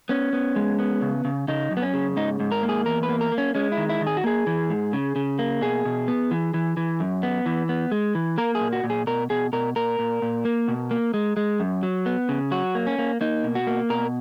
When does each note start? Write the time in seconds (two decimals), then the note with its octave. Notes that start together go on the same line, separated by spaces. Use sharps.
0.09 B3 C#4
0.33 B3
0.56 G#3
0.79 B3
1.02 C#3
1.25 C#3
1.48 C#3 D#4
1.71 F#2
1.77 B3
1.82 C#4
1.94 C#3
2.16 G#2 D#4
2.40 G#2
2.51 A#4
2.63 A#3
2.69 G#4
2.86 E2 A#4
3.03 B4
3.09 A#3
3.21 A#4
3.32 A#3
3.38 C#4
3.55 G#3 C#4
3.72 E4
3.77 D#3
3.89 E4
4.01 D#3
4.07 G#4
4.17 F#4
4.24 A#3 G#4
4.47 E3
4.70 G#2
4.93 C#3
5.16 C#3
5.39 A#3
5.61 B2 G#4
5.85 B2
6.08 B3
6.31 E3
6.54 E3
6.77 E3
7.00 F#2
7.23 B3
7.46 E3
7.69 B3
7.91 G#3
8.15 E3
8.38 A#3 A#4
8.55 G#4
8.60 A#2
8.73 F#4
8.84 A#2
8.90 G#4
9.07 B2 A#4
9.30 B2 G#4
9.53 B2 A#4
9.76 A#2 A#4
9.99 A#2
10.22 A#2
10.45 A#3
10.68 B2
10.91 A#3
11.14 G#3
11.37 G#3
11.60 F#2
11.83 F#3
12.06 B3
12.29 C#3
12.51 F#3 F#4
12.75 A#3
12.87 C#4
12.98 A#3
13.21 A#3 D#4
13.44 B2
13.55 F#4
13.67 A#3
13.90 B2 A#4